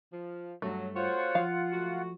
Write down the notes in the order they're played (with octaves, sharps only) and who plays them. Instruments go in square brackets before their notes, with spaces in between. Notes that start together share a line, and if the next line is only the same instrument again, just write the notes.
[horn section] F3
[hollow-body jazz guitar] B1 G2 [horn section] F#3 [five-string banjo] A3
[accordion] F4 F#5 [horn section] F#4 C5 C#5
[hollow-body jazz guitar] F3 [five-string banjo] F5
[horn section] F#3 A3 F#4